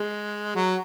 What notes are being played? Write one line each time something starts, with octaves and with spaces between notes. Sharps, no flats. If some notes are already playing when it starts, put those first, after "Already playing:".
Already playing: G#3
F#3